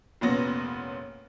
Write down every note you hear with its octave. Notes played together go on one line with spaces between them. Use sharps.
F1 A#2 A#3 B3 C#4 A#6